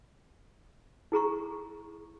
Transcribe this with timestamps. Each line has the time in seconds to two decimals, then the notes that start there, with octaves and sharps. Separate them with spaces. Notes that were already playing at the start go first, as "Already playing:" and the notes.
1.12 E4 G#4 A#5 C#6